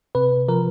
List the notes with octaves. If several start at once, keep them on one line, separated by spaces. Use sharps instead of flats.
C3 B4
F3 A#4